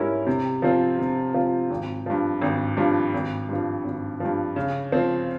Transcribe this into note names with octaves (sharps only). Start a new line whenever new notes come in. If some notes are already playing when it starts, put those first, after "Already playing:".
Already playing: G#2 G3 C#4 E4 A#4
C3
F3 C4 F4
C3
F3 C4 F4
G#1
G2 F3
G#1
G2 F3
G#1
G2 F3
G#1
G2 F3
C#3
F3 C4